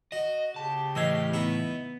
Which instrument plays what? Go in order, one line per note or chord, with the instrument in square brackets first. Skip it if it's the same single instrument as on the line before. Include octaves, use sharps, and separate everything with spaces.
[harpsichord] F#4 [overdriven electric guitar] D#5
[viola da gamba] C#3 G4 [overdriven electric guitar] A5
[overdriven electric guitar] A2 [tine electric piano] E3 E6 G#6 [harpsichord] D#5 F5
[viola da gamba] B3 [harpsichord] D#4 E4 C#6